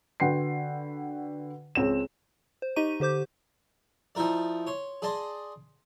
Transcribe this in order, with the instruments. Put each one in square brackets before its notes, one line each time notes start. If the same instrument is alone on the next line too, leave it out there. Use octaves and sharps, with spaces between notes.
[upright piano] D3 F#4 B4 G5 C6 C7
C#2 C4 C#5 E7
[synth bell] C5
D#4 G4 D#5 A#5 C#6 D#7
D3 G4 C5 D6 G6
[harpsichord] F3 D#4 E4 A#4 D5
C#5 C6
G#4 D5 D#5 A5 C6